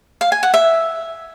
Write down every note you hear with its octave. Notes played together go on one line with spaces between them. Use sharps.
F5
G#5
F#5
E5